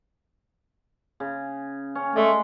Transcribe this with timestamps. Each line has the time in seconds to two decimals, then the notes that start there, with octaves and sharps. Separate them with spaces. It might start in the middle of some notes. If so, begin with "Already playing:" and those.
1.20 C#3
1.95 C#4
2.16 G#3 A3 D5